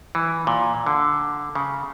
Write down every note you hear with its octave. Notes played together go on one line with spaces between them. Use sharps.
E3
A#2
D3
C#3